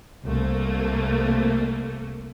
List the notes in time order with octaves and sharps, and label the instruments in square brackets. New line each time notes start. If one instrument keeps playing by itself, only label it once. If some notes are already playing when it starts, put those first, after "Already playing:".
[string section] C2 A3 A#3